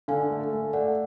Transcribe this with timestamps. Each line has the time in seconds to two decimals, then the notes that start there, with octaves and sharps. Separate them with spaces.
0.08 D3 F5 G#5
0.30 A3
0.53 A3
0.73 A3 D5 F#5